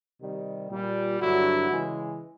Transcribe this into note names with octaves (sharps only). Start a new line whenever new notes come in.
C3 D#3 G3
A#2 G3
G2 D3 F#3 E4 F#4
C#3 E3 G#3